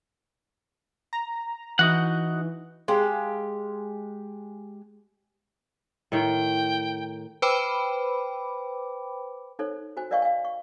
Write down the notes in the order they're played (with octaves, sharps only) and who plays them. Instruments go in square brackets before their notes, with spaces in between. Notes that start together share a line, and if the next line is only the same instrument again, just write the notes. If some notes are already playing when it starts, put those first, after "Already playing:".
[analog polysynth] A#5
[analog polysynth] E3 [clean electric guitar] D#4 F#4 F#5
[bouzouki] G#3 G4 F5
[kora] A2 D#3 [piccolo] G5
[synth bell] B4 C5 G5 B5 D6
[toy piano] D#4 A4 C5 C#5
F#4 C5 G#5
A#4 D5 D#5 F5 G#5 C#6
F5 G#5
C#6